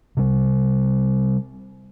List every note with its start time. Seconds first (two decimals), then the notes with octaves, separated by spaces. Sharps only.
0.17 C3 G3